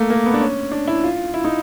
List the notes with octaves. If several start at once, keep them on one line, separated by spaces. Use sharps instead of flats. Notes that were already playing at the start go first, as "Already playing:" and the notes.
Already playing: A3 A#3
A#3
B3
D4
C#4
D4
E4
F4
E4
D#4